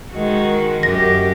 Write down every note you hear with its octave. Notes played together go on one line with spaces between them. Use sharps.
D#3 G#3 F#4
F#2 G4 A#6